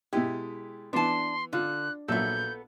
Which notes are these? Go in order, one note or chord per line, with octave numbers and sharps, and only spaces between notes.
B2 G#3 E4 G4
E3 B3 D4 A5 C6
D3 F4 F#6
A#1 F#3 B3 A4 E5 G6